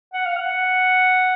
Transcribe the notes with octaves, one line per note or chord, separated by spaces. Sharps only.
F#5
F5
F#5